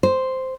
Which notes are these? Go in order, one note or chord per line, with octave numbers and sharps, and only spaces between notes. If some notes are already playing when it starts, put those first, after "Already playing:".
C5